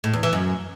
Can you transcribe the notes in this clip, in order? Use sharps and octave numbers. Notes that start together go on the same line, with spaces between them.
A2
E2
E3
F#2